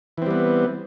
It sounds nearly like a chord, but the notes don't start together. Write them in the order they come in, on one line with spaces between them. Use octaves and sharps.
E3 C4 G3 B3